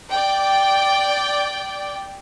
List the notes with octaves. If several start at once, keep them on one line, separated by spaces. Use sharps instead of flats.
D5 G5